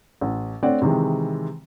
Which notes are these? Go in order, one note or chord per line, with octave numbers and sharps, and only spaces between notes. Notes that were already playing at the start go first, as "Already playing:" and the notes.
A1
A3 C4 D4 C#5 D5 F#5
C3 D#3 E3 G#3